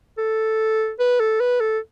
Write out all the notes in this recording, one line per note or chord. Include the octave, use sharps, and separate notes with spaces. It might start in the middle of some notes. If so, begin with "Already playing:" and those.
A4
B4
A4
B4
A4